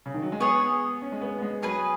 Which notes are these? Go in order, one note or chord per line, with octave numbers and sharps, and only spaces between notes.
C#3
D#3
F#3
G#3
B3 G#4 C#5 F#5
C#4
G#3
B3
B3
G#3
F#3 C#4 G#4 B4 G#5